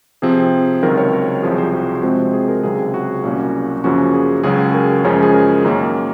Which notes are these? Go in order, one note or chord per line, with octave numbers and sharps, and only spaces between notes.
C3 F3 C4 G#4
C#2 C3 D#3 F#3 A#4
C#5
A#4
C2 C3 F3 C4 G#4
C5
F#4
C3 F3 G#3 C4 F#4
G#4
A#4
C#2 C3 D#3 F#3 G#4
F#4
C2 A#2 F#3 A#3 C#4
F#2 C#3 F3 A#3 C#4 F#4
G#4
C#2 C#3 F#3 C#4 G#4
A#4
F#2 C#3 F3 G#3 C#4
G#4
A#4
F#2 D#3 A#3